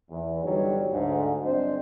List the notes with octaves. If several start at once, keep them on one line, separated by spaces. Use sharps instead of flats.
E2
G1 F#3 G3 D#4 B4 C#5
D2 G#2
G1 F#3 C4 D4 C5 D#5